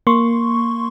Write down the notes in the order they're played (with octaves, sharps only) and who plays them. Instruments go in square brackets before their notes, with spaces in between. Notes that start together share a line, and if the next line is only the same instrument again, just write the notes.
[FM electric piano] A#3 C6 C#6